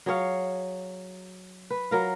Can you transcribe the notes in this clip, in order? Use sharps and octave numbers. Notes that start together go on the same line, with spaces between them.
F#3 G#4 C#5 F5
B4
F#3 A#4 F5